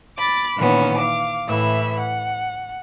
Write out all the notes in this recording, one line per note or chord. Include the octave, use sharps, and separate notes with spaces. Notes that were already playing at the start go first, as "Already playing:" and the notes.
B5 D6 A6
A#2 D#3 E3 B3 C#4
F5 D6
A2 E3 E5 B5
F#5